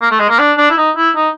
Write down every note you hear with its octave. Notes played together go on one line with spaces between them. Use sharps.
A#3
A3
G#3
A#3
D4
D4
E4
D#4
E4
D#4